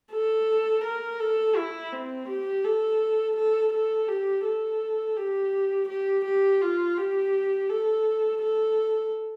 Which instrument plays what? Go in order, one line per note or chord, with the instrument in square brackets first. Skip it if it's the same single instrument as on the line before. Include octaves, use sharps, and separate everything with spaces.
[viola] A4
A#4
A4
E4
C4
G4
A4
A4
A4
G4
A4
G4
G4
G4
F4
G4
A4
A4